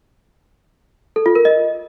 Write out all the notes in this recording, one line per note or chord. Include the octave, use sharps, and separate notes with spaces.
A4
F4
A#4
D#5